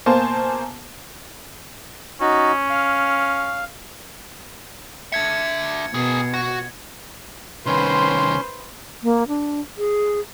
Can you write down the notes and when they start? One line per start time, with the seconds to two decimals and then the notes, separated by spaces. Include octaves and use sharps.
0.06 B2 A#3 C5 G#5 A5
2.21 C#4 D#4 F#4
2.70 F5
5.12 D4 E5 G#6 C#7
5.94 B2 G#4 A#4
6.34 F#4
7.66 C2 D#3 C#4 B4 C5 C6
9.03 A#3
9.28 D4
9.78 G#4